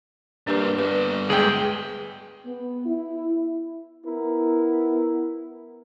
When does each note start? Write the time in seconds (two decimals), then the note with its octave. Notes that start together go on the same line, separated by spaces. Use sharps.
0.47 G2 A#3 D4 G4 B4
0.78 G2 B3 B4
1.30 D2 G#3 G#4 G5
2.46 B3
2.86 E4
4.06 B3 E4 A#4